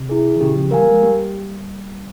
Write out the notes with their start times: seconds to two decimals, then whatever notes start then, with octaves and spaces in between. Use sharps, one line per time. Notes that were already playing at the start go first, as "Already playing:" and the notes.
Already playing: C3
0.09 E4 G#4
0.36 E3
0.40 A#2 C#3 G4
0.56 C#3 F3
0.71 E3 G3 A#4 F5 G#5
0.82 A#3
0.87 F3 G#3
1.02 G3 A#3 G4